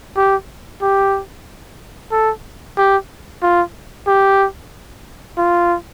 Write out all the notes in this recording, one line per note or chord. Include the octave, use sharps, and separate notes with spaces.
G4
G4
A4
G4
F4
G4
F4